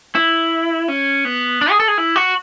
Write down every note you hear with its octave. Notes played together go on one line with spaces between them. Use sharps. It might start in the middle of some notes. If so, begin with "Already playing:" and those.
E4
C#4
B3
D4
G#4
A4
G#4
E4
F#4